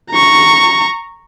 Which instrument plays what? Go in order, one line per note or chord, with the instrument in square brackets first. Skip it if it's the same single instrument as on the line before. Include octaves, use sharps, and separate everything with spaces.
[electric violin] A#5 C#6